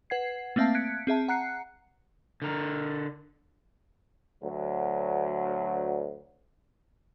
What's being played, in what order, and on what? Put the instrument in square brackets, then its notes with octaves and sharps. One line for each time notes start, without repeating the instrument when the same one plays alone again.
[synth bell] B4 F#5 G#6 C7
A3 A#3 C4 E5 F5 A5
F#6 G#6 B6 C#7 D7
C4 G#4 E5 A5
F#5 A#5 F#6 C7 C#7
[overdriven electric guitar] D3 A#4
[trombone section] D2 F#3